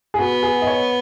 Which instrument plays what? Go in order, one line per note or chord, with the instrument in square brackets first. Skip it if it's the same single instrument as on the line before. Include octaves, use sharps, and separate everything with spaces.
[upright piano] G#4
[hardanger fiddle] B3 [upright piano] F#4
[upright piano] G#4
D#5
C#5